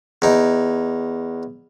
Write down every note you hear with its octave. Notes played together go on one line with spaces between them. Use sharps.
E2 D#4